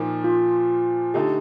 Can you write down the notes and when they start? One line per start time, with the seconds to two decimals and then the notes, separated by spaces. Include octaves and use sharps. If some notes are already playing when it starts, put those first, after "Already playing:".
Already playing: A#2 F3 A#3 D#4
0.24 F4
1.14 D3 A3 D#4 G4 A4